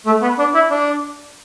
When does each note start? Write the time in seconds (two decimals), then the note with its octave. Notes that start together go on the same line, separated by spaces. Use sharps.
0.06 A3
0.22 B3
0.38 D4
0.54 E4
0.70 D4